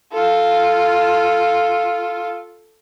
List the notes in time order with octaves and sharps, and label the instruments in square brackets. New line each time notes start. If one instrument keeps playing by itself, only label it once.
[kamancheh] F4 A4